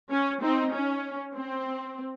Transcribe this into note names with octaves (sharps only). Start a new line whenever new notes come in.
C#4
C4 D#4
C#4
C4